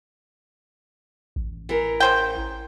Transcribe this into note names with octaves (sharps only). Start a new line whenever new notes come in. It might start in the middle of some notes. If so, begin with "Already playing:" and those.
A1
E3 A#4
C#3 C5 G5